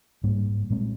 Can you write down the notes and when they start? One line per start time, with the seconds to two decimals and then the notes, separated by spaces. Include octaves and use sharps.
0.23 G#2 G3 A#3
0.70 A#2 G#3 C4